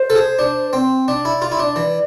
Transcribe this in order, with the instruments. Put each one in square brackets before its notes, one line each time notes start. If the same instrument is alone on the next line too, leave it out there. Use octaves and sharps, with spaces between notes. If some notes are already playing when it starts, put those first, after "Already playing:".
Already playing: [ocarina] C5
[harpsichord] A4
G#4
D4
C4
[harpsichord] D4 [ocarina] D5
[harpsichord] E4
F4
E4
D4
E3